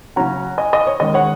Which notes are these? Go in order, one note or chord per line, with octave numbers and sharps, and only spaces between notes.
C#3 F#3 C#4 F#5 A#5
D#5 G#5
D#5
C#5
D#3 G#3 C#4 D#5
C#5 F#5